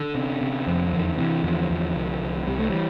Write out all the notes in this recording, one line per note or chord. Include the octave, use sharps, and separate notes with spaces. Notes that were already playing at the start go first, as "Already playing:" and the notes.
Already playing: D3
C3
C3
F2
E2 D3
C3 E3
E2 D3 F3
E2
C2
C2
C2 G3
A3
E3 G3